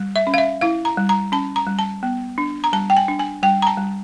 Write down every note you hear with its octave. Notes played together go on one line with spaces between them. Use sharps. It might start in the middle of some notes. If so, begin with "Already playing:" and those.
Already playing: G3
E5
C#4
F5
E5
E4 F5
A#5
G3
A#5
C#4 A5
A#5
G3
A5
B3
D4
A#5
G3 A5
G5
G#5
D4
G#5
G3 G5
A#5
A5
G3